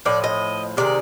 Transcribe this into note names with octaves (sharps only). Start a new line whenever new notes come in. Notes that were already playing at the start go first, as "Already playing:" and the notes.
A2 F3 D5
D#5
C3 D#3 G#3 D5